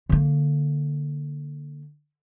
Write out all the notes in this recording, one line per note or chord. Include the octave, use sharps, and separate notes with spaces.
D3 A#3